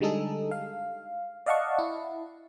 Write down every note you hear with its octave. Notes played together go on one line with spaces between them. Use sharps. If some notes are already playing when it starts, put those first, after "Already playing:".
D3 G3 G#3 D#4 G#4 A4
F5
D5 D#5 F5 F#5 A5 C#6
E4